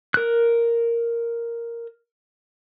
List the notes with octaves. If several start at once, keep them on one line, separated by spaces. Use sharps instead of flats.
A#4 F#6